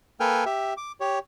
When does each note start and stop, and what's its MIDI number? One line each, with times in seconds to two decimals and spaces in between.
0.20 0.44 58
0.20 0.44 69
0.20 0.44 71
0.20 0.44 79
0.20 0.44 80
0.20 0.44 89
0.46 0.74 67
0.46 0.74 76
0.77 0.92 86
1.00 1.19 67
1.00 1.19 73